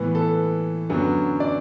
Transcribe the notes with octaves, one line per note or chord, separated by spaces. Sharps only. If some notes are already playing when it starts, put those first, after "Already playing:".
Already playing: A2 E3 B3
A4
F#2 D3 F#3 B3
D5